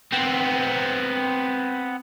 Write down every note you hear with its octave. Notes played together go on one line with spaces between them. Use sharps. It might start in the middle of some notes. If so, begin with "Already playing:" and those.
B3 C4